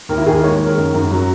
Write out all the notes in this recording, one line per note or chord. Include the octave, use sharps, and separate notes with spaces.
D#2 A#4
E4
D#2 G#4
A#4
G#3 C#5
D#3
A#4
F#2
F#2
F#3